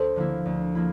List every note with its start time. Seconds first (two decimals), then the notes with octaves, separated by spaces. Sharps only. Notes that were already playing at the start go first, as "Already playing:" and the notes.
Already playing: D2 A4 C5
0.16 D3 F3 A#3 E4
0.46 D2
0.75 F3 A#3 E4